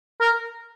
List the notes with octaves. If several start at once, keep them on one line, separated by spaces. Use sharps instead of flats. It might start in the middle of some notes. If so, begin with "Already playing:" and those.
A#4